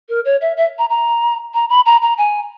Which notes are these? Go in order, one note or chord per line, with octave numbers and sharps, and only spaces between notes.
A#4
C#5
E5
E5
A#5
A#5
A#5
B5
A#5
A#5
G#5